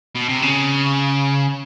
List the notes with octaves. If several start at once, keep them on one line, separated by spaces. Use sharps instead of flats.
B2
C3
C#3